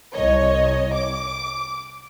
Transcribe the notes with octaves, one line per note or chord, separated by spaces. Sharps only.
C2 C#5 D#5
D6